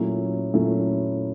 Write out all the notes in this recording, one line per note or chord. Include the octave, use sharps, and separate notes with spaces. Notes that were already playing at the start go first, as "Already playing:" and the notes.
Already playing: A#2 F#3 A3 C#4 E4
A#2 F#3 A3 C#4 E4